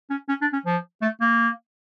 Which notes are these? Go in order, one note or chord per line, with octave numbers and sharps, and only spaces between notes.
C#4
C#4
D4
C#4
F3
A3
A#3